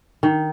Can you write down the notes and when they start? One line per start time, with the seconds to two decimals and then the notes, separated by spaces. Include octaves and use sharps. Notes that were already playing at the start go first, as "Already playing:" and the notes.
0.23 D#3